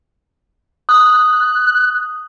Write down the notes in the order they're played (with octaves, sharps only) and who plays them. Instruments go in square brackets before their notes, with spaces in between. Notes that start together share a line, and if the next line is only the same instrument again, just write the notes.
[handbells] D#6 [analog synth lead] F#6